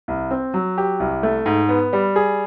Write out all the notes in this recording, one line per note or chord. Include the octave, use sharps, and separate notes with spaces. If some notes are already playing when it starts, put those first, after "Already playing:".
C2
C4
F#3
G4
C2
A3
G#2
B3
G3
G#4